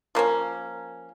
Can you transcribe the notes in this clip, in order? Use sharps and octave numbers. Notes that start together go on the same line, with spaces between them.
F3 A#3 C#4